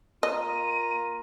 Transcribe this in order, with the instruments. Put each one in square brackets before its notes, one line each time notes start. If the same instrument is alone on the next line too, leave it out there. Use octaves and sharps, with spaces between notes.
[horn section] A#3 F4 A#5 [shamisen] D#5 [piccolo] D#7